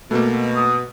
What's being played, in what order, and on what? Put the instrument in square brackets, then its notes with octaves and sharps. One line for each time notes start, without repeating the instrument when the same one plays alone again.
[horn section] B2 [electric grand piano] A3 A#3
[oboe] D#6